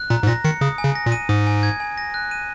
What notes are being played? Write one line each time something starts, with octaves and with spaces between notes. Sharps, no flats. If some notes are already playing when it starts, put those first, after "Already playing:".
Already playing: F#6
A#2 A#5
G#2
A#2 A#6
D#3 C#7
C#3 D#6
G#5
C#3
A#6
A#2
D#7
G#2 D#6
G#5
G#6
G#5
A#6
F#6
D#7